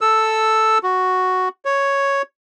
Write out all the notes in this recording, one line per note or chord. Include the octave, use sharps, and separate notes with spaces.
A4 E6
F#4
C#5